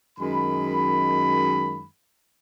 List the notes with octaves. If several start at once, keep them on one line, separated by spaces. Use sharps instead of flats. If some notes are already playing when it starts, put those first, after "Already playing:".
F#2 D#3 G#3 B5